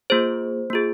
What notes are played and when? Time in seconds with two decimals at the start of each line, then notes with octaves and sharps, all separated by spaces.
0.10 A#3 F4 G#4 C5
0.70 A#3 F4 G#4